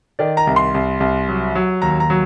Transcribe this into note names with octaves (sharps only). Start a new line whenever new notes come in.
D#3 D5
A#5
C2
C6
C2
C2
F#3
F#3
D#2 A#5
A#5
F#3